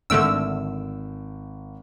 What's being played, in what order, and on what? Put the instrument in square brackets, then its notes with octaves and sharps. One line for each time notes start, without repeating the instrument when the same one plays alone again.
[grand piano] G#1 F6 D7 [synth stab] D3 A3 E6